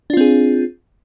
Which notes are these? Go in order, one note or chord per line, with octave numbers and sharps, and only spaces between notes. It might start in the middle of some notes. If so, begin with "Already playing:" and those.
C4 D4 F4 G#4